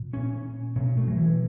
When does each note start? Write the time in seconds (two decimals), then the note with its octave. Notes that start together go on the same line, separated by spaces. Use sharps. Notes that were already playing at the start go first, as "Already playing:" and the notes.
Already playing: A#2
0.13 C#4
0.76 B2 C#4
0.97 A3
1.07 F#3
1.17 E3